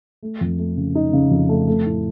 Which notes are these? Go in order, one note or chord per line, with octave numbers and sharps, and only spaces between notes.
A3
F2
A3
C#3
D#4
C#3
F2
A3
A3
A2